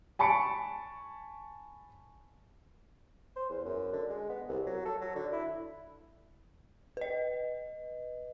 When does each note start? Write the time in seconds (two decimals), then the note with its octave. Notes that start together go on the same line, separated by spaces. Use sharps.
0.19 G#5 A5 B5 C#6 C#7 D7
3.36 C5
3.50 E2
3.65 F#2
3.93 D3
4.09 G#3
4.29 B3
4.48 C2
4.66 F#3
4.85 A4
5.01 F#3
5.16 D3
5.32 E4
6.97 B4 D#5